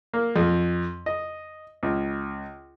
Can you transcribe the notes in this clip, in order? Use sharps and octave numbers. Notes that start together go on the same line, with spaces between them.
A#3
F2
D#5
C#2